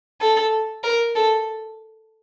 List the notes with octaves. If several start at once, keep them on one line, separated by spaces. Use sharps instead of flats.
A4
A#4
A4